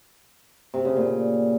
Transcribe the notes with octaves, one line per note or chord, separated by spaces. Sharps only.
C3
C#3
A#2